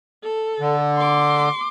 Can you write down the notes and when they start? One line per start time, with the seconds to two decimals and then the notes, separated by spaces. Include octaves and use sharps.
0.23 A4
0.60 D3
0.97 C6 D6